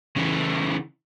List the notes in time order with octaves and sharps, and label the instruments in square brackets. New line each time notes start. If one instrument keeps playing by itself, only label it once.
[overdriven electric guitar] C#3 E3